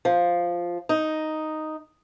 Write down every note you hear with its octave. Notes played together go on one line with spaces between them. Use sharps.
F3
D#4